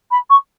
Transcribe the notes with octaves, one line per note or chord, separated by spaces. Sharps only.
B5
C#6